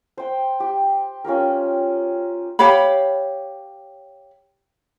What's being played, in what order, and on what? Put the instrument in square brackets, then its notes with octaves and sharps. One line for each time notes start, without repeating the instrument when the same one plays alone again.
[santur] C5 G5
G4
C#4 F4 G4 A#4
[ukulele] G4 C#5 F5 B5